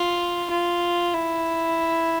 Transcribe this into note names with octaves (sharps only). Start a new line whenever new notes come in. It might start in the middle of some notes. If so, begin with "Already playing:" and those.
Already playing: F4
F4
E4